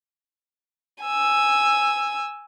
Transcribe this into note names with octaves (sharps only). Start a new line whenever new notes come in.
G#5 E6